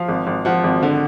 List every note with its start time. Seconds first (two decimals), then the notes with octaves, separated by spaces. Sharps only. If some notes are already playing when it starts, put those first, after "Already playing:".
Already playing: F3 F5
0.09 G#1
0.27 G#1
0.45 F3 F#5
0.64 G#1
0.83 D3